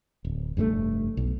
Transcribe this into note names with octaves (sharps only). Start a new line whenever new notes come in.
D1
F1 G2 C#3 A3
B1